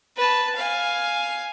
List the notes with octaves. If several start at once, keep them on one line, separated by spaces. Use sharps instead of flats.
B4 A5
F5 G#5